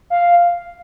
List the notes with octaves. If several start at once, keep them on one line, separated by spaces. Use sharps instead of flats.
F5